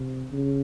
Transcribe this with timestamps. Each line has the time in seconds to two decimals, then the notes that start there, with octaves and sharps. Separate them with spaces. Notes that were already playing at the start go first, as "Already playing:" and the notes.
Already playing: C3
0.32 C#3